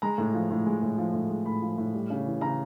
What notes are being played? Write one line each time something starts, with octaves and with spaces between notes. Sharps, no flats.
G#3 A#5
A2
F3
A2
G#3
A2
F3
A2
G#3
A2 B5
F3
A2
G3
C#3
E3
C#3 A#5